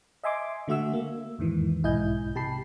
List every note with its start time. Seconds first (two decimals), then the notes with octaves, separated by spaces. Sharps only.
0.23 D#5 E5 G#5 C6 D6
0.68 D3 A3 F#4 E5 E6
0.93 A#3
1.39 E2 G#2 D#3 E3
1.83 B1 G#2 E4 D#5 G#5 G6
2.35 C3 G4 A5 B5 C7